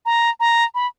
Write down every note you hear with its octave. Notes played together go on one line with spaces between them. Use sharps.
A#5
A#5
B5